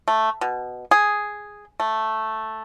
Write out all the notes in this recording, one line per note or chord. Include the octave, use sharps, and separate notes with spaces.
A3
B2
G#4
A3